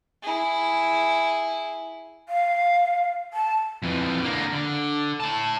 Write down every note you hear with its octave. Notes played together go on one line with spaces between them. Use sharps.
E4 G#4
F5
A5
F2 E3
D3 A#3
D3
E4 A5